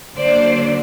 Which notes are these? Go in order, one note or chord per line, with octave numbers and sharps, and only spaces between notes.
D3 F#3 A#3 D4 C5 D5